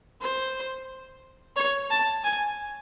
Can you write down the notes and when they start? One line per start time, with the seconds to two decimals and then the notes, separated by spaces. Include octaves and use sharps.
0.21 C5
1.56 C#5
1.90 A5
2.24 G#5